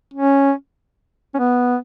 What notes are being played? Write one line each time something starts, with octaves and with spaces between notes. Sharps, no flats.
C#4
C#4
B3